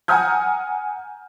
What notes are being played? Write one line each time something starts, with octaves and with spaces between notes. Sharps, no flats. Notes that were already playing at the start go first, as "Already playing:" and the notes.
F#5 G#5 A#5 D#6 F6 G6